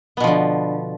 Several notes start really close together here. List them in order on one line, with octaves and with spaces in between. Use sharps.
B3 B2 F3 D3